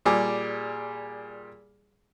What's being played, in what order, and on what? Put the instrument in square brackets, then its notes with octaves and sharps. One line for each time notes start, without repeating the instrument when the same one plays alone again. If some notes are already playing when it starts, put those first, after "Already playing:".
[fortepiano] A#2 G3 G#4 D6